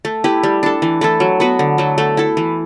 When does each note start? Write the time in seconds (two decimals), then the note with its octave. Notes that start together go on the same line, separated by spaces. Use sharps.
0.05 A3
0.24 E4 G4 B4
0.43 G3
0.63 D4 A4
0.82 E3
1.01 A3 E4 A4
1.20 F#3
1.40 B3 F#4 B4
1.59 D3
1.78 F#3 A3
1.98 A3
2.17 E4 A4
2.37 E3